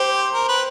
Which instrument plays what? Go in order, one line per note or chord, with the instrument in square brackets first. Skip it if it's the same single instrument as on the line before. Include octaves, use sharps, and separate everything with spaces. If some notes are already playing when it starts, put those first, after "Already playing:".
Already playing: [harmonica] G4 [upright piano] C5
[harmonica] A#4
B4